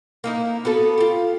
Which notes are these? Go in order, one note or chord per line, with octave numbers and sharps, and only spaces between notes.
A#3 D#4 E4
B3 F#4 A4
F4 G4